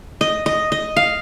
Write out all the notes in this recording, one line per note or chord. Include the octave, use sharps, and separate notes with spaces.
D#5
D#5
D#5
F5